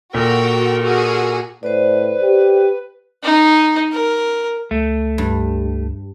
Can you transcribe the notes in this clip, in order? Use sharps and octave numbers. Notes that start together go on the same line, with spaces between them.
A#2 F#4 A4 A#4 G5
F#4 G#4
A2 B4 C5 D5
G4
D#4
A#4
C#2 A3
G2